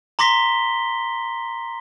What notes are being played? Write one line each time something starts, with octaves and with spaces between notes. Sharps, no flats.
A#5 C6 D6 A#6 B6 G7